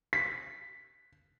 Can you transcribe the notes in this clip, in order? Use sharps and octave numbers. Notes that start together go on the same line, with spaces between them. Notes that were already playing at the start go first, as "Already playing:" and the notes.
B6